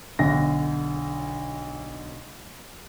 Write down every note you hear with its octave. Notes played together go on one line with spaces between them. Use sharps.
B1 D3 A#6